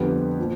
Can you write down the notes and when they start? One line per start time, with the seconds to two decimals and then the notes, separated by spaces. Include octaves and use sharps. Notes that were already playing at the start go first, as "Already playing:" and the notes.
Already playing: F2 D3 G3 B3
0.38 A#2 F3